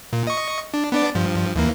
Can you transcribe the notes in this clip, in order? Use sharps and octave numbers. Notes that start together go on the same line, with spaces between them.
A#2
D#5 C#6
D4
B3 D4 D5
G2 F3
D#2 E3 A#3